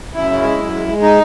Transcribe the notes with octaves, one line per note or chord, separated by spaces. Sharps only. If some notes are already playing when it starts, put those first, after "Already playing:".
F#2 E4
C#3
G#3
F#2
G#3
G#3
D#4